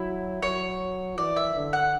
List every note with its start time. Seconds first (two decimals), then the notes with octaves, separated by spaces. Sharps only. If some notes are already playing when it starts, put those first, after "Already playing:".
Already playing: F#3 E4
0.42 F#3 C#5
1.17 E3 D5
1.36 E5
1.55 D3
1.73 F#5